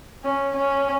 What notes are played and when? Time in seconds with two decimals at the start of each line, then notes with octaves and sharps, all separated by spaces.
0.24 C#4
0.56 C#4